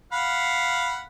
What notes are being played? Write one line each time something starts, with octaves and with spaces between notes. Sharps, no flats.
F5 F#5 B5